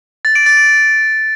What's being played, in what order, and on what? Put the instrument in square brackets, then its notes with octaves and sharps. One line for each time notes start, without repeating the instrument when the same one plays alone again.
[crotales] A6
D7
A6
D7